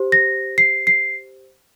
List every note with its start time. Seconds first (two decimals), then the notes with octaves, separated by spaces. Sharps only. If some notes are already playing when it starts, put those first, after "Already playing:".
Already playing: G4 C5
0.12 A#6
0.58 C7
0.87 C7